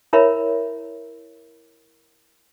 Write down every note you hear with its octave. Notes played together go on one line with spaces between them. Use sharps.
E4 A#4 C#5 E5 B5